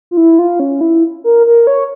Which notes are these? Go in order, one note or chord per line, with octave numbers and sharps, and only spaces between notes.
F4
E4
F4
C#4
E4
A#4
A#4
C#5